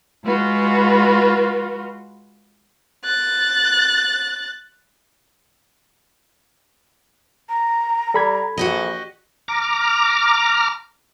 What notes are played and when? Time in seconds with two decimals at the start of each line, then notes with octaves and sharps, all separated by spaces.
0.23 G#3 F4 F#4 B4
3.04 F#6 A6
7.49 A#5
8.14 G3 A4 B5 G#6
8.58 A#1 F#4 G4 D#5
9.48 A#5 D6 F6